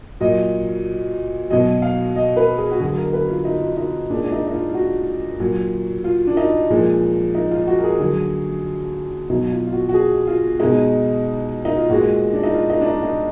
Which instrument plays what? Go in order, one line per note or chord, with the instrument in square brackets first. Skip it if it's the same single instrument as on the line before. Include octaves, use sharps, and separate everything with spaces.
[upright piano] A#2 F#3 D#5
B2 F#3 D#5
F5
D#5
B4
G#4
F#4
D3 F#3 G#4
A#4
B4
F4
D#4
F4
D#4
A#2 D4
G#3
D4
D#4
D#4
F4
F4
F#4
A#2 F#3
F4
D4
D#4
A#2 F3 G#3
D#4
F4
F#4
A#4
G#4
D3 F#3
B2 F#3 D#4
F4
F4
F#4
F#4
G#4
F4
B2 G#3 D#4
D#4
F4
A#2 G#3 F#4
D4
D#4
F4
D#4
D4
D#4
D#4